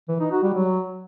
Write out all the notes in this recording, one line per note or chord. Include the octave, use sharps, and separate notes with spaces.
E3
D#4
F#4
G3
F#3